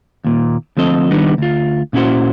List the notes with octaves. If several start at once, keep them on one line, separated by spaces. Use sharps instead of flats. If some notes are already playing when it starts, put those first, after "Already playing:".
D#2 A#2
D2 F3 C4 A4 D#5
D#3 G3 B3 D4 D#4
D2 F4
A#2 C#4 E4 F#4 C5